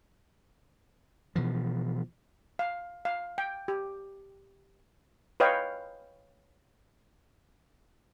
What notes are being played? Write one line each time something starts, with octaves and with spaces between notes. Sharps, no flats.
B2 E3 F3
F5
F5
G5
G4
B4 C#5 D#5 F5 G5